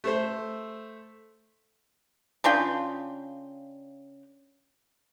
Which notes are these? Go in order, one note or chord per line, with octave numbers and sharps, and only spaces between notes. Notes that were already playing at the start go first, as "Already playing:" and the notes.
A3 A4 C5
C#3 D4 F4 G5